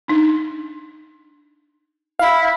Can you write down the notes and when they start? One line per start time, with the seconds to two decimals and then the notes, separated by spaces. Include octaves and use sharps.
0.08 D4 D#4
2.19 E4 F5